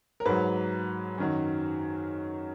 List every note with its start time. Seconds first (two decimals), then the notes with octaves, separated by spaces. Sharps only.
0.20 A#4
0.25 G#2 F#3 B4
1.18 F#2 D#3 F#3